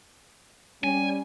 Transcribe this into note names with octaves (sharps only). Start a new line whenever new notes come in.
G3 C#4 G#5